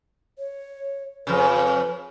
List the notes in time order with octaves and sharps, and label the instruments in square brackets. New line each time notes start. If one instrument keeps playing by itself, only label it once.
[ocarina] C#5
[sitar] F2 C#3 [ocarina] B4